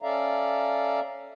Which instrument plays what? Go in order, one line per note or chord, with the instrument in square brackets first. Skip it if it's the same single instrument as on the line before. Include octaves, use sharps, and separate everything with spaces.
[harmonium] C#4 A4 D5 E5 F5 A#5